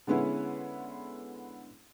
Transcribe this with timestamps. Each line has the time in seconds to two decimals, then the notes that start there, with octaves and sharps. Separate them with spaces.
0.07 D3 G#3 B3 C#4 E4